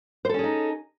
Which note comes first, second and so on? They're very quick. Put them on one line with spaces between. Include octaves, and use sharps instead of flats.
C5 A4 C#4 G#4 D#4